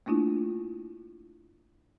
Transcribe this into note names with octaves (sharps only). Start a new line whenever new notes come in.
A3 A#3 D4 E4 F4